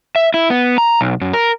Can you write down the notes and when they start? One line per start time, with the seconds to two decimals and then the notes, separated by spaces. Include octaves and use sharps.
0.16 E5
0.34 E4
0.50 B3
0.78 A#5
1.01 B1
1.21 F#2
1.33 A#4